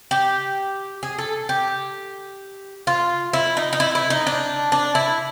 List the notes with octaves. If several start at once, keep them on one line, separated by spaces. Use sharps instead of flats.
G4
G#4
A4
G4
F4
E4
D#4
D#4
E4
E4
D#4
D4
D4
E4